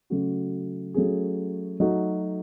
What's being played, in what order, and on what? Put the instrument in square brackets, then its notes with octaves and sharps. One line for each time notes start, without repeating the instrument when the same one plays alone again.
[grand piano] C#3 F#3 A3 C#4 F#4
F#3 A3 C#4 G#4
F#3 A3 D#4 F#4 A4